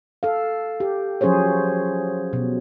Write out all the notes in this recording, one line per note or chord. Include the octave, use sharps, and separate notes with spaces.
A4 F5
G4
F3 F#3 C#4 G#4 C5 C#5
B2